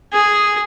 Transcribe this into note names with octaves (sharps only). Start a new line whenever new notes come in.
G#4